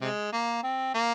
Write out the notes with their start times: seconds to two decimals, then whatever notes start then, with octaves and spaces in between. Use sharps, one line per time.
0.01 C3 G#3
0.33 A#3
0.63 C4
0.95 A#3